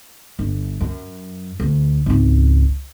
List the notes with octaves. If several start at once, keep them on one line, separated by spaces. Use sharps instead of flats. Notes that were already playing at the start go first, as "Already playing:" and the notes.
G1
F#2
D2
G#1 C#2